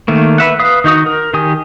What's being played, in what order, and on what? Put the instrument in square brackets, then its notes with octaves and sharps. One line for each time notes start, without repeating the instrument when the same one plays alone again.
[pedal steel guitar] D#3 A3 A#3
B4 E5 F#5
B4 F5 D#6
D#3 D#4 F#4 D#6
A#4
D#3 G4 G#5 D#6